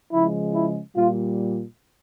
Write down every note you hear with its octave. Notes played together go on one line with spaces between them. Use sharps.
C#3 F3 G#3 E4
E4
A#2 G3 F4